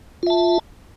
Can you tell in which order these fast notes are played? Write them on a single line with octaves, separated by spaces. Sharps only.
F4 E5 A5